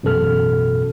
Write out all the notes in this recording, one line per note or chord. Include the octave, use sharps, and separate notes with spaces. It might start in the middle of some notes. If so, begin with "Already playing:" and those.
A1 F#2 B2 A4 F6